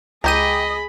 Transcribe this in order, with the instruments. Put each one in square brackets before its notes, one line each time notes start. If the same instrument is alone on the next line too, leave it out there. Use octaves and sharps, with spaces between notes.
[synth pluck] C#2 D#7 [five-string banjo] G4 A#5 [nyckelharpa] G#4 B5 [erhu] D#5